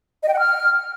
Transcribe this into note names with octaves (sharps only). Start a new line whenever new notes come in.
D#5
G5
F#5
F6